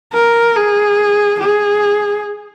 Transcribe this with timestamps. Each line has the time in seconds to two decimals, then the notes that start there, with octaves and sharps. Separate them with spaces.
0.13 A#4
0.56 G#4
1.40 G#4